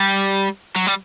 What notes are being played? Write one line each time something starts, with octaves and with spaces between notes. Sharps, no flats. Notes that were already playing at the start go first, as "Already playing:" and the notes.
Already playing: G3
F#3
G3